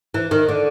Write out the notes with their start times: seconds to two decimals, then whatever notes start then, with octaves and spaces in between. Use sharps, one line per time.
0.14 E3
0.31 D#3
0.49 D3